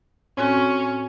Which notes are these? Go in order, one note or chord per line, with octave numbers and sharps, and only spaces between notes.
A2 C4 C#4 F#4